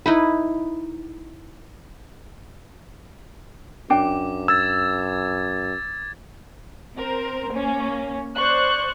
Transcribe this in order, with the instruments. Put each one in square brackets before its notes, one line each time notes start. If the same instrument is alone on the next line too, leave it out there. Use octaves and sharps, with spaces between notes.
[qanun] D#4 E4 B4
[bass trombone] F#2 [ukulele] D4 G5 [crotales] D6
[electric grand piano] E6 [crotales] G#6 A6
[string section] C4 A#4 C5
A#3 C#4
C5 D5 C#6 F#6